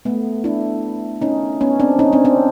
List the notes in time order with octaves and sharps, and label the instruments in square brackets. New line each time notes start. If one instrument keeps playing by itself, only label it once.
[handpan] A3 B3
D4 E4
C#4 D#4
B3 C#4
C4 D4
C#4 D#4
C4 D4
C4 D4